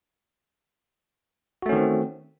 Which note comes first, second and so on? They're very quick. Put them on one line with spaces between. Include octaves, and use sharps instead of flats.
F#4 A3 C#4 D#3 C4